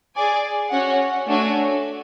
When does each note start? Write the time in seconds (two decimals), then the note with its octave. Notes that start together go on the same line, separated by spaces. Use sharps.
0.15 G#4 D5 G#5
0.70 C#4 F#4 C#5 F#5
1.27 A3 D4 F#4 C#5 G#5